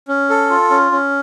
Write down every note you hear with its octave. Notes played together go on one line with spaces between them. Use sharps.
C#4
A4
F4
C#4
C#4